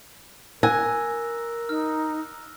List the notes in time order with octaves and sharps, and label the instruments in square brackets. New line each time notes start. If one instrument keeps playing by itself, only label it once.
[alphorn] A#4 [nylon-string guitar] G#5 [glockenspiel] E6 F#6 A#6
[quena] D#4 [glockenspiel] F6